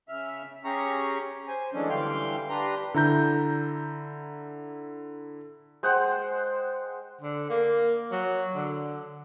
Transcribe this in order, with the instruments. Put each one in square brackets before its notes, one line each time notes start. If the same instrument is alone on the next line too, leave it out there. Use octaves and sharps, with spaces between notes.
[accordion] C#3 E5 F6
C#4 G4 G#4 A#5 C#6
C5 G#5
E3 F#3 G#3 A3 C#4 D4
D3 E3 G3 F5 G5 C6
D4 G4 B4 A#5 C6
[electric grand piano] D3 E4 A#5 G6
[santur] G#3 C5 F#5 G5
[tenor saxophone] D3
A#3
F#3
D3